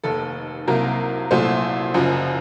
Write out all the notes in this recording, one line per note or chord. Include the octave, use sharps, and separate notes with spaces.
F1 D#2 D#3 A4
C2 C3 F#3 A#3 A#4
C2 A#2 F#3 A3 C5
F#1 F#2 F3